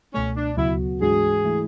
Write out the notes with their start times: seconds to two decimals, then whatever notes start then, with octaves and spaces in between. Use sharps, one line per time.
0.14 C#2 B2 A3 C#4
0.36 D4
0.57 D2 C#3 F#3 B3 E4 F#4
1.01 G#2 E3 G#3 D4 F#4 G#4
1.45 E3 A3 E4